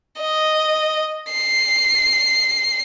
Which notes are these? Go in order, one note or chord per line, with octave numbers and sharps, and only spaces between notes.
D#5
C7